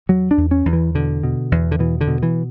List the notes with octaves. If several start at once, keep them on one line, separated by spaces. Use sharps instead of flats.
E2 F#3
D4
E2
C#4
E2
E3
B2 D3
B2
E2
D3
B2 E3
D3
B2
E3